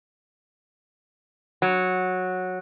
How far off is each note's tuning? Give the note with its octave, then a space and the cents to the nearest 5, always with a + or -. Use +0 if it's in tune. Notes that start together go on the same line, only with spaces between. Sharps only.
F#3 -10